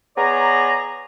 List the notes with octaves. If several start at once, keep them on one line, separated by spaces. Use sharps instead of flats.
B3 G#4 C#5 D5 A#5